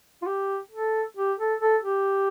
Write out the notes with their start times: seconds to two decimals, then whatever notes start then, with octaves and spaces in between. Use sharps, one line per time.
0.22 F4
0.27 G4
0.71 A4
1.17 G4
1.39 A4
1.61 A4
1.83 G4